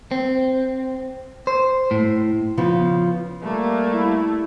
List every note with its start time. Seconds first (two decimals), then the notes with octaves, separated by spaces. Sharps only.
0.11 C4
1.47 C5
1.91 A2
2.57 C#3 F3 B3
3.43 G3 A3 A#3
3.92 E4